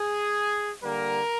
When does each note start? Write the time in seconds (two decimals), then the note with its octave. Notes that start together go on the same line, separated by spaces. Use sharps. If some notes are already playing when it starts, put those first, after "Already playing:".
Already playing: G#4
0.82 D3 G3 A#3 A#4